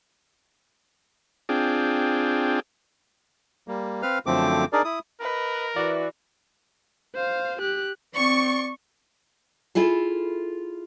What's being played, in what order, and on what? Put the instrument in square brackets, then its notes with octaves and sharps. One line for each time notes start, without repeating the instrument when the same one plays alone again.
[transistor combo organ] C4 D4 F4 G#4 G5
[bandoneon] G3 A#3
C4 B4 F5 F6
F#2 D3 F3 A3 C4 D6
D4 D#4 G#4 A#4 D5
E4 D#6
[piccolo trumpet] A#4 [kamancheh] B4 D#5
[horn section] E3 [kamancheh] F#4 [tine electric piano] D5
[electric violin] C5 F5
G4 F#6
[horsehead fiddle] C4 D5 [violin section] C#6
[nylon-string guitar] E4 F4 G#4 A4